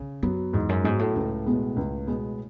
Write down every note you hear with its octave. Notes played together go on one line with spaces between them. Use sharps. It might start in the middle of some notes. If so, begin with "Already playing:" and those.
Already playing: C#3
F#2 F#3 B3
E2 G#2
F#2
G#2 F#3 B3
A2
C#2
B2 G#3 B3
C#2
B2 G#3 B3